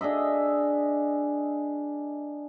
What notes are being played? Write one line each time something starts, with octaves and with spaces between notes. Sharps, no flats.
D4 G#4 D#5 E5